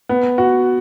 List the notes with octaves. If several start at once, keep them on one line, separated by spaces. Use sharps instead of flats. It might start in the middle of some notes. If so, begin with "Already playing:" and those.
B3
F#4